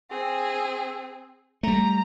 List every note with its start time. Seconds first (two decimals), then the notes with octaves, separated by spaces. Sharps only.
0.11 C4 G#4
1.63 G3 A3 A#5